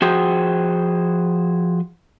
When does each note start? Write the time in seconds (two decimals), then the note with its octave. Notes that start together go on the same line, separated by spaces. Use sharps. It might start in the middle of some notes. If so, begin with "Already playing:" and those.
0.02 F3 F#4 G#4 C5 G5